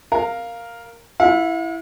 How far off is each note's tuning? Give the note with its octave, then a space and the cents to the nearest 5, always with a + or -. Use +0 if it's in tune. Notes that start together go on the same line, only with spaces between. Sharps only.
A#4 +0 F5 +0
E4 +5 F5 +45